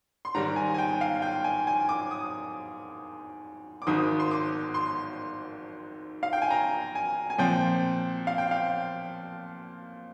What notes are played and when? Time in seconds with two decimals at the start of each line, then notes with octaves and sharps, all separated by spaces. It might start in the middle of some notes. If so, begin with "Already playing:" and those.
0.25 C6
0.34 G#2 D#3 G3 A#5
0.56 G#5
0.74 G#5
0.78 G5
1.01 F5
1.22 G5
1.44 G#5
1.67 G#5
1.89 D6
2.11 D#6
3.82 D6
3.87 G#1 G#2 D#3 D#6
4.20 C6
4.31 D6
4.74 C6
6.23 F5
6.33 G5
6.42 G#5
6.51 A#5
6.95 G#5
7.30 G#5
7.38 A#2 F3 C4 G5
8.27 F5
8.38 G5
8.51 F5